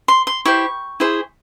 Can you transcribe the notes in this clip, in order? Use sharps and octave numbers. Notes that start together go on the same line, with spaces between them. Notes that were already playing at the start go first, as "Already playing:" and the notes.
C6
C6
E4 G4 C5 C#6
E4 G#4 C5